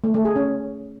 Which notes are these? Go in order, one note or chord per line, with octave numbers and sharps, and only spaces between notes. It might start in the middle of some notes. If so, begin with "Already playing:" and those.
A3
A3
G#4
C#4